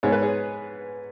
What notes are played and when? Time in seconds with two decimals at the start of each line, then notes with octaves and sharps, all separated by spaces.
0.03 G#2 G#3 B3 C#5
0.12 B4
0.22 G#4 C#5